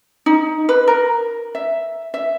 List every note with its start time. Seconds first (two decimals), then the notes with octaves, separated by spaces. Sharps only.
0.26 D#4
0.69 B4
0.88 A#4
1.55 E5
2.14 E5